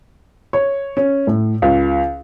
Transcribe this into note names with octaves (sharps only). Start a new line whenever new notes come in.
C#5
C#4
A2
C#2